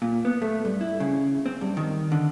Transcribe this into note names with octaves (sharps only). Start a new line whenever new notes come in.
A#2
B3
A3
G2
E4
C#3
C4
G2
D#3
D3